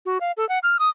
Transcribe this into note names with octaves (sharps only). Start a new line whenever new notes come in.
F#4
F5
A4
F#5
F6
D#6